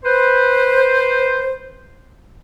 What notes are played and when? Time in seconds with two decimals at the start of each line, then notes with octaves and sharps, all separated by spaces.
0.04 B4 C5